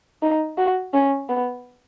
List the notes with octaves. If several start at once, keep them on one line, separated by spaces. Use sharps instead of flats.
D#4
F#4
C#4
B3